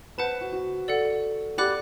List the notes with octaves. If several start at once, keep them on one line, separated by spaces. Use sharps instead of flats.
B4 C5 F#5 A5
F#4
F#4
A4 D5 F#5
G4 D5 F#5 B5 D6 F#6